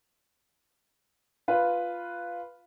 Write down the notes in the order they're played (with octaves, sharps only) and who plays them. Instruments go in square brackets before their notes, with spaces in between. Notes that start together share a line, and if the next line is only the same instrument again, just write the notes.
[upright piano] F4 B4